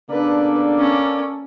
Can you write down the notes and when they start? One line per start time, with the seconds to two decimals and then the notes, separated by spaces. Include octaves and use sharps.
0.10 C#3 A#3 B3 D4 A4 B4 D5
0.78 C#4